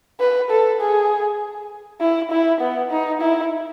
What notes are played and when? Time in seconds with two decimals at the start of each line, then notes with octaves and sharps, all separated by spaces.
0.20 B4
0.50 A4
0.80 G#4
2.01 E4
2.31 E4
2.61 B3
2.91 D#4
3.21 E4